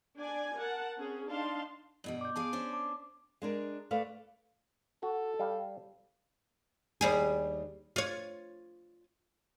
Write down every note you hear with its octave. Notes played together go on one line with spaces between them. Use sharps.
D4 D5 G#5
A#4 F#5 A5
C4 C#4 G#4
D4 D#4 F5 A5 C6
G2 B2 G3
D6 G6
G2 G#4 F5 A5 D6 D7
C#4 D4 C5
A5 D6
G#3 D4 A#4
A3 B4 D5 F5
F#4 A4
G3 F5 G5
D#2 G3 G#4
F4 C#5